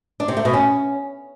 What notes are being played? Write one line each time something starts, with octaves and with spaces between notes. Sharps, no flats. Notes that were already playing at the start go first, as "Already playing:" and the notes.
D4
C3
A3
B2
C#4